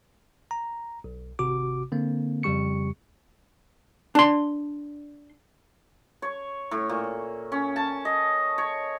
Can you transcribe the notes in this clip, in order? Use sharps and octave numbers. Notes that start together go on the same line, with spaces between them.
A#5
B1
G#1 C3 F#4 D6
D3 A#3 C4
F2 C#3 G3 G4 C#6 C#7
D4 C6
C#5
A2
A#2
C#4
A5
D#5
C#5